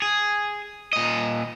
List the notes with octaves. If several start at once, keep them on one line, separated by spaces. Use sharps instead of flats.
G#4
A#2 D#5